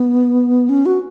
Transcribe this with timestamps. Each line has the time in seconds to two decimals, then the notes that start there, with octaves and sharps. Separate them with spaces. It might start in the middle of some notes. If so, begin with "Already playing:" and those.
Already playing: B3
0.69 C#4
0.86 F#4